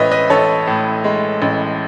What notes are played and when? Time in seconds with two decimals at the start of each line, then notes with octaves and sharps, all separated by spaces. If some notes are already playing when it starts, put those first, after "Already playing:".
Already playing: A1 A2 G#3 B4 C#5 D#5 E5
0.11 B4 D#5
0.30 A1 A4 C#5
0.67 A2
1.04 G#3
1.42 A1